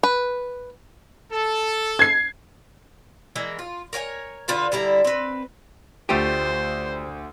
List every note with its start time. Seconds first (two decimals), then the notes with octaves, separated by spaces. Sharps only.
0.03 B4
1.31 A4
1.99 G#6 C7
3.36 E3 G#3 A#3
3.59 F4
3.93 A#4 C#5 F#5 G#5
4.48 D3 F4 B4 F5
4.72 D3 G3 E4 A#5
5.05 C4 B4
6.09 D2 A3 F4 G4 C5 G5 D#7